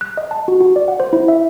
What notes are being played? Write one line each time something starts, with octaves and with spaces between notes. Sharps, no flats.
F#6
D#5
A5
F#4
F#4
D5
F#5
C5
E4
E5